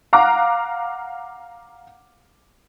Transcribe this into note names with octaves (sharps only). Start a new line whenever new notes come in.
F5 F#5 A#5 D6 F6 F#6